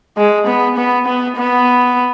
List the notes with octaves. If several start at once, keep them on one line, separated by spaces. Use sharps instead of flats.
G#3
B3
B3
B3
B3